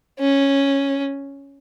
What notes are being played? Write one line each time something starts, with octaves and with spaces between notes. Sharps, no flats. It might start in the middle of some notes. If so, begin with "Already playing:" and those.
C#4